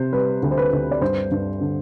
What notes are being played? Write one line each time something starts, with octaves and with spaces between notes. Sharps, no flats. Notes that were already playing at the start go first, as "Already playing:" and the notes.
Already playing: C3 C5
G3 B4
D2
C5
B4
D2
D5
G2 C5
G2
D3